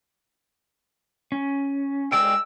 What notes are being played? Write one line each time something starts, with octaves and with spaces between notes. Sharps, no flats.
C#4
G#3 D5 G5 E6